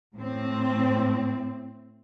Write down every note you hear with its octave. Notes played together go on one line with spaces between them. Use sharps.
A2 C4